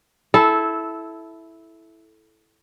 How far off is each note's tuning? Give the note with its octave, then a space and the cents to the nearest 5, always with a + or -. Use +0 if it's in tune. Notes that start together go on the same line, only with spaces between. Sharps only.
E4 +0 A4 -15